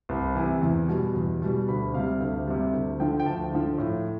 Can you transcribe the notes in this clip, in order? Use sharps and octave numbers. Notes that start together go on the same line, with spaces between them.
C2
C3 E3
E2
B2 G3
E2
B2 G3
D2 B5
C3 G3 F5
D2
C3 G3
D2
D3 F3 G5
G5
D2 A5
D3 F3
A2